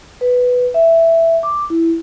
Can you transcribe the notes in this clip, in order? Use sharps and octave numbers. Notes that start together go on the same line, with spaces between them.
B4
E5
D6
E4